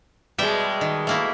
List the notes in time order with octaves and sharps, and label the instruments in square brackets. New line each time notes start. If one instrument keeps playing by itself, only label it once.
[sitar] B2 G#3 [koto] G3 E5 G5
[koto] D#3
A3 A#3 E4